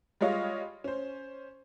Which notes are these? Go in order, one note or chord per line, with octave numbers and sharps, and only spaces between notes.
G3 G#3 F4 C#5 D#5 F5
C#4 C5